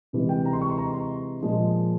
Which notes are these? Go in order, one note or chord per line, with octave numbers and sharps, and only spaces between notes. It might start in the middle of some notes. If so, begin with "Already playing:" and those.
C3 E3 G#3
G5
A#5
C6
C#6
C6
A#5
C6
A#2 F3 G#3